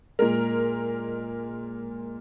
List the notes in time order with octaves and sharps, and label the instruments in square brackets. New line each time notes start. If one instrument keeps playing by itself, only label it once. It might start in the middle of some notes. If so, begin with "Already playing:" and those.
[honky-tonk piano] A#2 G#3 A#4